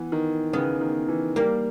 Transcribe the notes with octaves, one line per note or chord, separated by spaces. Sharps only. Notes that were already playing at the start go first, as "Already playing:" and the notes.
Already playing: E3 B3
D#3
C#3 B3
D#3
E3
G3 A#3